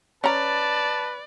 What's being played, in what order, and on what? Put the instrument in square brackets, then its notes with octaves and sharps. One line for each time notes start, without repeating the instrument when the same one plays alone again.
[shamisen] C#4 A#5 [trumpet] B4 [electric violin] D5 [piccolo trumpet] A5